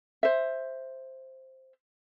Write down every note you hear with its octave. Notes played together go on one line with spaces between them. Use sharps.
C5 E5